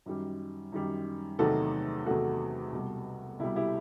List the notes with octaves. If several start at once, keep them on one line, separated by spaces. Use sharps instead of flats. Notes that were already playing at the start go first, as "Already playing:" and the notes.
F#2 D#3 G3
F#2 D#3 G3
E2 C3 D#3 F#3 A3 F#4 A4
E2 C3 D#3 F#3 A3 F#4 A4
C2 B2 G3
C2 B2 G3 E4
E4 G4